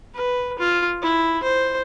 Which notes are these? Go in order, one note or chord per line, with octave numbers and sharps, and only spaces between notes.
B4
F4
E4
C5